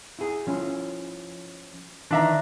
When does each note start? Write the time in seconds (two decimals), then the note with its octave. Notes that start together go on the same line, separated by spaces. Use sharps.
0.19 E4 G#4
0.47 F3 C#4 E4
2.11 D#3 E3 D4 E5 A#5